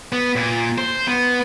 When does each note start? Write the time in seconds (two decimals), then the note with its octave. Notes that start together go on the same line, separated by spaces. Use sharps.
0.13 B3
0.36 A#2
0.78 C5
1.08 B3